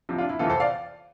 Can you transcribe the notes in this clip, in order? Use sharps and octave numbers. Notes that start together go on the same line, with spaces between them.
C2 C3 F3
D4 F4
E4
F2 C3 E3 F4 A4
A4 C5
D5 F5